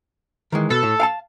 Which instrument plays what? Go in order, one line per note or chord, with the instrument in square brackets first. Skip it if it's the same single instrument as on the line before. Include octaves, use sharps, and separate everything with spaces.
[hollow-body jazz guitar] D#3 E3 G#3
[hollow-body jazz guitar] B2 [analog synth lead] A4
[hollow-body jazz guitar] A2
F5 G5 A5